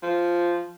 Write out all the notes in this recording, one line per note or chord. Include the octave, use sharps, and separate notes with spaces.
F3